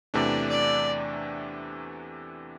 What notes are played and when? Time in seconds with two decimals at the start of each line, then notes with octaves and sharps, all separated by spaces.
0.14 E2 C3 E3 A3 D4 D5
0.50 D5